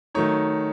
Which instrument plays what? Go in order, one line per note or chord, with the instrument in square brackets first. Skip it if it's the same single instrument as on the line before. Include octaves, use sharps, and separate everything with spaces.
[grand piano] D#3 F#3 A3 D#4 C#5